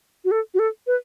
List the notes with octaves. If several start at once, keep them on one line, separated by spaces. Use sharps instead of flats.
F#4
A4
F#4
A4
B4